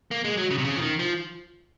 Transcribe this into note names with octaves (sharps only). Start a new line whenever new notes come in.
A#3
G#3
F#3
C#3
C3
C#3
F3
D#3
F3